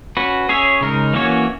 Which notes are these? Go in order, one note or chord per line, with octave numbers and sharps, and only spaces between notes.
C#4 F#4 B4
C#4 G#4 C#5 E5
C#3 G#3 D#4 A#4
E3 A#3 C#4 F#4 C#5